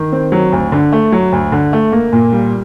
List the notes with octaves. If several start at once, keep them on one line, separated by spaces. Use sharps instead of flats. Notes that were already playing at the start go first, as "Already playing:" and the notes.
Already playing: D#3
C4
F#3
D2
D3
A3
F#3
D2
D3
A3
A#3
A#2
G3